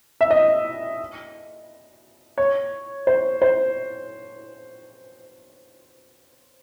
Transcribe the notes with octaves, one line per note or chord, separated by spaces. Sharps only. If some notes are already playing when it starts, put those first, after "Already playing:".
E5
D#5
C#5
C5
C5